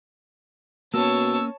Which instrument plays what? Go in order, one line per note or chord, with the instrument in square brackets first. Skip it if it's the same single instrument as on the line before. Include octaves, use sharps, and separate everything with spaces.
[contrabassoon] B2 [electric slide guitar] A#3 C#4 [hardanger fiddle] C#5 A5 [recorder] E6